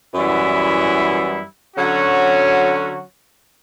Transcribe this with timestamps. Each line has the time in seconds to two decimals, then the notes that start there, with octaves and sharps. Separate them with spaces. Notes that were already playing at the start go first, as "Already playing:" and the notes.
0.14 F#2 E3 G3 B3 E4
1.74 D3 F#3 C#4 F#4